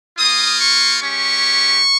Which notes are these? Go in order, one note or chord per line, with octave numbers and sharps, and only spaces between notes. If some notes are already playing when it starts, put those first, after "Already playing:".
A#3 F4 D#6
C#6
G#3 C#4 G4 C#6